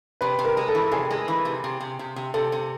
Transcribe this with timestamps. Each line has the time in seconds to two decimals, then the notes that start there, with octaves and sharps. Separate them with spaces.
0.21 C3 B4
0.39 C3
0.45 A#4
0.57 G#3
0.68 A4
0.75 E3
0.92 C3 G#4
1.11 G#3
1.28 E3
1.45 C3
1.64 C3
1.80 C3
1.99 C3
2.16 C3
2.34 C3 A4
2.52 C3